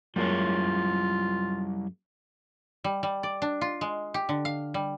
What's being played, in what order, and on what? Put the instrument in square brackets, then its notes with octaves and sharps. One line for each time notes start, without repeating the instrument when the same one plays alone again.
[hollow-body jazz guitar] F#2 G#3 A#3 [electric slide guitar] G3 E4 C#5 [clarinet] F4
[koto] G3
G3
D5
D4
F4
G#3
G4
D3
F5
G3